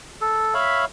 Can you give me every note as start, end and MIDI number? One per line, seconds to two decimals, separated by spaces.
0.21 0.54 69
0.54 0.85 73
0.54 0.85 76
0.54 0.85 77
0.54 0.85 83